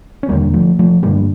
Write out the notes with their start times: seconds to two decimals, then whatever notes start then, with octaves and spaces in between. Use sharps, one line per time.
0.23 C#4
0.29 E1 E2 D3 G3 A#3
0.53 F3 A3
0.79 F3 A3
1.03 A1 G2 D3 G3 A#3